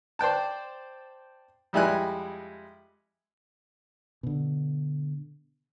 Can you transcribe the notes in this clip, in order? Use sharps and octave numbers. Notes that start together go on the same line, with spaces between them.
C5 D5 G5 A5
F2 G3 G#3 E4 G#5 F#6
B2 D3